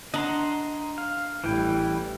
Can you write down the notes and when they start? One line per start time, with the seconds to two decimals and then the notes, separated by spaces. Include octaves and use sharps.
0.14 D4 D#5 F#5 A#5 C6
0.98 F5
1.44 A1 E3 G3 E4 G5